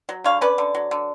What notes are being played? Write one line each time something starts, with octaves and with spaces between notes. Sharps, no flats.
F#3
D3 C#5 F5
C#4 B4 D5
D3
F#3
D3